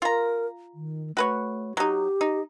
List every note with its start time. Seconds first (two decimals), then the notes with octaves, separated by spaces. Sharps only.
0.02 F4 A#4 A#5
0.74 D#3
1.17 A3 F#4 B4 C#5
1.77 F#3 D#4 G4
2.21 D#4